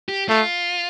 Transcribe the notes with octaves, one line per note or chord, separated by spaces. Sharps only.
G4
A3 F4